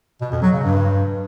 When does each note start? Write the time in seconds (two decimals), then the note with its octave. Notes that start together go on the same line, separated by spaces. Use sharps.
0.21 B2
0.32 F2
0.42 F#3
0.53 C#3
0.64 G2